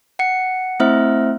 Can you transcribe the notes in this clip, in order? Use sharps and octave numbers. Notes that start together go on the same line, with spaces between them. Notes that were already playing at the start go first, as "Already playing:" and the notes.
F#5 C#7
A3 C4 E4 C5 E5 F6